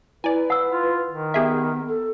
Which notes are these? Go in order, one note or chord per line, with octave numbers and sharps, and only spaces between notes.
E4 B4 D5 G#5
F#5 E6
F4
D#3
B3 G4 G#4 E5
A4